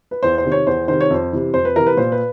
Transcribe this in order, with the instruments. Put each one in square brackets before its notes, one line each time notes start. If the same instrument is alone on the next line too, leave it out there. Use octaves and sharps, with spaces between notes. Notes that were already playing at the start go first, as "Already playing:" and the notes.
[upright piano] B4
E2 C5
C5
C3 D#3
C#5
E2 C5
C3 D#3 C5
C#5
F2 C5
C3 E3
F2 C5
B4
C3 E3 A#4
B4
A#2 C5
B4